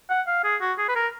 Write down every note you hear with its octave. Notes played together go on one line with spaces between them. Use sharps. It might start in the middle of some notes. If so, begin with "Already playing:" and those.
F#5
F5
G#4
F#4
G#4
B4
A#4